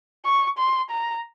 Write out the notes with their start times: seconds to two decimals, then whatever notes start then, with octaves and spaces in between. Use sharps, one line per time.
0.25 C#6
0.58 C6
0.91 A#5